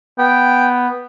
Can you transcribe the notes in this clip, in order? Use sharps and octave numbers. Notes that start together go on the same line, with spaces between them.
B3 G5